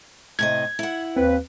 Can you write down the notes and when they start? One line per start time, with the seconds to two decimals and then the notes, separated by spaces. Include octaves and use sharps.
0.39 A2 C3 D#5 G#6
0.79 E4 F#5
1.17 D#2 C4 B4